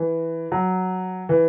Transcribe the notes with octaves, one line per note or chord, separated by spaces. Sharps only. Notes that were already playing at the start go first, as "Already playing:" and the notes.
Already playing: E3
F#3
E3